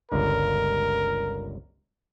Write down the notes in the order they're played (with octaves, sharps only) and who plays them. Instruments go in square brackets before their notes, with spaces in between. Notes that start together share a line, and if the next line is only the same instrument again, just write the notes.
[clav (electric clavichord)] G1 C#2 D3 [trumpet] A#4